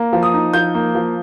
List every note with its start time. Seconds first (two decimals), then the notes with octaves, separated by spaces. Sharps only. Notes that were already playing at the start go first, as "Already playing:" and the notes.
Already playing: A#3
0.13 F3
0.23 D#6
0.34 D#4
0.53 F3 G6
0.75 A#3
0.95 F3